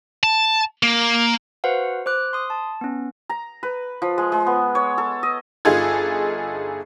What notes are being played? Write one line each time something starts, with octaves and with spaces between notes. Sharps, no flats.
A5
A#3
F#4 B4 C5 F5 F#5
C5 D6 F#6
C6 D#6
A5
B3 C#4
A#5
B4
F3
G#3
G#3
B3
C#5
A4
D#5
G1 D#4 F4 G#4 A4 G#6